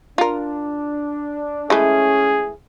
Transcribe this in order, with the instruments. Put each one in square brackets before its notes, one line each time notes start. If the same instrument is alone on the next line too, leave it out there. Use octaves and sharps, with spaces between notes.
[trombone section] D4 [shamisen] F4 A#4
[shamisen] E3 G#3 A3 [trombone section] C#4 [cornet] G#4